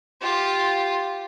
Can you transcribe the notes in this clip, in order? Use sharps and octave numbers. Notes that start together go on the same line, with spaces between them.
F4 G4